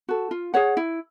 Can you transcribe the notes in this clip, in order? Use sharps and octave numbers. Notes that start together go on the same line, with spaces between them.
F#4 A4
F4
G#4 C#5 F#5
E4